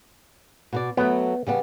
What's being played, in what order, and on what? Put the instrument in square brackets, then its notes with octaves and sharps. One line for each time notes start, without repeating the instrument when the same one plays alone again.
[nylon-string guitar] B2 F#4 D5
[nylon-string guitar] F#3 A3 [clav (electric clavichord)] B3
[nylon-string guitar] C#3 G3 B3